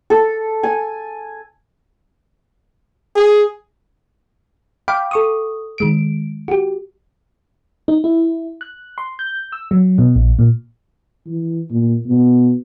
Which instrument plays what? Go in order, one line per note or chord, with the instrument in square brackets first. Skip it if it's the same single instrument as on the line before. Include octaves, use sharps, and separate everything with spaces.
[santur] A4
G#5
[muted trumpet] G#4
[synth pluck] F5 G5 B5 D6
A4 C#6 D#6
D#3 G#3 D7
F#4 G4
[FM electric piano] D#4
E4
F#6
C6
G6
E6
F#3
B2
A#1
A#2
[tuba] E3
A#2
B2